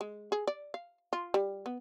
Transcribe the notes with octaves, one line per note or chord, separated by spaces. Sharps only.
G#3
G#4
D5
F5
F4
G3
B3